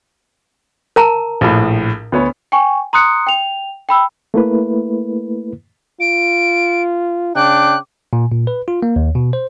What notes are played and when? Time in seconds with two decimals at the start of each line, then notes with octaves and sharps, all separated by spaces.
0.96 A#4 A5 A#5
1.41 A#1 A2
2.12 D2 B3 C#5
2.52 G5 G#5 C#6
2.93 A#5 C6 D#6 F#6 C#7
3.27 G5 F7
3.89 G5 B5 E6
4.34 A3 A#3 E4 B4
6.00 F4 D7
7.35 C#3 D4 G5 D6 F#6
8.13 A#2
8.32 A#2
8.47 B4
8.68 F4
8.83 A#3
8.96 D#2
9.15 B2
9.33 C5